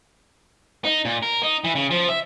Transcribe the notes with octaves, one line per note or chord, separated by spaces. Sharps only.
D#4
A#2
A#4
D#4
E3
C#3
F3
E5